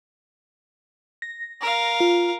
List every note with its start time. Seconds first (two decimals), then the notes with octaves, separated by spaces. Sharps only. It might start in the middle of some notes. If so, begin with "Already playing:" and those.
1.22 A#6
1.61 A#4 F5
2.00 F4